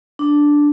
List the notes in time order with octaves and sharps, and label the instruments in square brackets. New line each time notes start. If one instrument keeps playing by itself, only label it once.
[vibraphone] D4